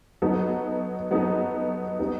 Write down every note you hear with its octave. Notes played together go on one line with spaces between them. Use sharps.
F#3 B3 D#4 A4
F#3 B3 D#4 A4
G3 B3 D#4